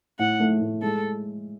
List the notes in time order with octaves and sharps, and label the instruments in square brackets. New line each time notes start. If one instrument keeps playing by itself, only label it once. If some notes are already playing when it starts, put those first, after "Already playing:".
[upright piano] A2 [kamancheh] F#5
[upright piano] A3
A2
[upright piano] G#3 [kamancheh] A4